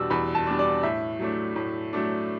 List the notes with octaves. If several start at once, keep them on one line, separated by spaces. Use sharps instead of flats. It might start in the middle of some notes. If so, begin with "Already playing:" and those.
Already playing: E2 B2 G3 D4 E6
E2 B5
A5
B2 G3 D4
D5
A2 E5
F#3 A3 D4
A2
F#3 A3 D4